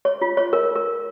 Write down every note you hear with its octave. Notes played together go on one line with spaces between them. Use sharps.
C#5
F4
C#5
A#4
A#4